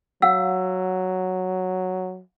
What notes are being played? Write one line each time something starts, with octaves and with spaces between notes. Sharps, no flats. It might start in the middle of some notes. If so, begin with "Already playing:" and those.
F#3 F5 F#5 E6